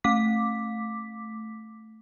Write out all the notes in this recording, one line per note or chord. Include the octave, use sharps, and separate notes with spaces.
A3 D6 B6